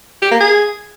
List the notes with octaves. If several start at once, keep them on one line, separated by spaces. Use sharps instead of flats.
G4
A#3
G#4